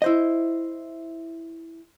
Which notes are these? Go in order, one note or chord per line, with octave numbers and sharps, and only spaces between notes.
E4 C5 D#5